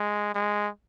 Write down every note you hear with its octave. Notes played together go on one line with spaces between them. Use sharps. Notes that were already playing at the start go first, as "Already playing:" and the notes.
Already playing: G#3
G#3